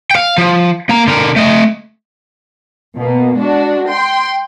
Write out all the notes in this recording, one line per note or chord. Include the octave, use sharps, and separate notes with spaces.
F5 G5
F3
A#3 A#5
D3 A#4
A3 D#5
B2 A#3
G#3 D4 F#4
G5 C6